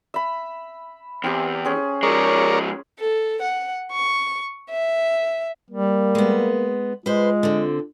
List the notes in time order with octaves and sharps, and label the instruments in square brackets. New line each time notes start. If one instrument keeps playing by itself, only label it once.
[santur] E5 B5
[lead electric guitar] E2 [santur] C4 G4
[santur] C#4 G#4 C5
[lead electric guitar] F3 G#3 [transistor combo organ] A#4 C#5 D5
[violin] A4
F#5
C#6
E5
[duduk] G3 [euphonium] A#3
[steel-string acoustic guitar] G#3 B3
[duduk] G#3 [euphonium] F4 [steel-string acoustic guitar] B4 C5
[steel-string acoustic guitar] D3 C4